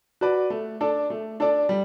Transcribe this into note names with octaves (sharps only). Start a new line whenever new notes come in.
F#4 B4 D5
A3
D4 A4 D5
A3
D4 A4 D5
G3